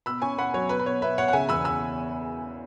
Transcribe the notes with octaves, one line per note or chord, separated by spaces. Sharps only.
B2 B5 E6
C#4 G#5 C#6
B2 F#5 B5
F#3 C#5
B2 B4
B4
B2 C#5
B2 B4 E5
B2 C#5 F#5
F#5
C#3 E5 G#5
E2 B5 E6
B5 E6